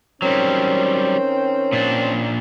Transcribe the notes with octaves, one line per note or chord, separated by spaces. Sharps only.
D#3 F#3 G3 C4 C#4
A#2 D4